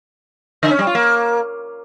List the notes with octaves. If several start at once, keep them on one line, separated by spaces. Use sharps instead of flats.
D3
C#4
G3
F4
A#3